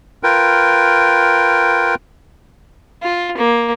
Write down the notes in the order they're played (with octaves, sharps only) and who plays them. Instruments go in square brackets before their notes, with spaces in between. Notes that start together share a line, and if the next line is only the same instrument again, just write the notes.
[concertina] F4 A#4 B4 G5
[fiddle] F4
A#3